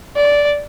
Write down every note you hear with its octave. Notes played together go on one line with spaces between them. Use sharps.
D5